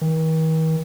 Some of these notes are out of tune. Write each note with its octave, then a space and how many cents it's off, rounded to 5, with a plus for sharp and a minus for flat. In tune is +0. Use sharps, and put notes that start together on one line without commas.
D#3 +45